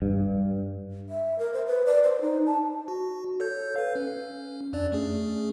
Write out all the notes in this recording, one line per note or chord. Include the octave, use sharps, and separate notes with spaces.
G2
E5
A#4
C5
B4
D5
C5
D#4
A5
F#4
A4 C#5 G6
B4 F5
C#4
F2 D4 D5
A3 C#4 G#4